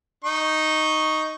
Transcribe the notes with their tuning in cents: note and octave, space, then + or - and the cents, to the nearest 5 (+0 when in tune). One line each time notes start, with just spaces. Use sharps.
D#4 +0 C#6 +0